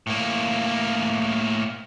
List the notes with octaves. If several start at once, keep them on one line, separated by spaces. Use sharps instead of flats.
A2 A#3